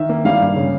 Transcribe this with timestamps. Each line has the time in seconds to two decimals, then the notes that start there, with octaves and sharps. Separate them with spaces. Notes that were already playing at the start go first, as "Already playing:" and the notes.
Already playing: D#3 E5
0.09 A#3
0.25 G3 F5
0.41 G2
0.56 C#3